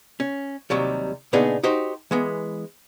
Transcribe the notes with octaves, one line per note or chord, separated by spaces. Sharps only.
C#4
D#2 C3 F#3 G3
A#2 C#3 B3 D4 D#4 G#4
D#4 F#4 G4 C5
E3 G#3 B3